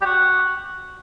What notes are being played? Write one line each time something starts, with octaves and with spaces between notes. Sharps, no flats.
G4
F#4